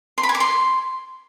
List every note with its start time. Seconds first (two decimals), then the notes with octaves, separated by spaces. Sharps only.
0.18 C6
0.23 B5
0.29 G#5
0.35 D6
0.40 C6